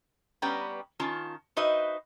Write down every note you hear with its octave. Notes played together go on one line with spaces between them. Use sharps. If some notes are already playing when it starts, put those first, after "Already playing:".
G3 B3 C#4 B4 G5 A#5
D#3 C#4 F4 A5
D#4 F#4 B4 C5 D#5 E5